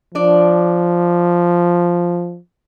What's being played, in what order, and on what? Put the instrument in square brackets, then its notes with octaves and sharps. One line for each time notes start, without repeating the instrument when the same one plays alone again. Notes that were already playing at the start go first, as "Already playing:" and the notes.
[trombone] F3 [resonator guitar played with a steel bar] D4 D5